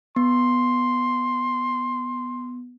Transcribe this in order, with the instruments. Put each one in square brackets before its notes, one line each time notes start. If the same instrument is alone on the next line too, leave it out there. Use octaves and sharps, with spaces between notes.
[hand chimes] B3 [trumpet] C6